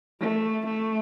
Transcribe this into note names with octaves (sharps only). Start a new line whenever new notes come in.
A3
A3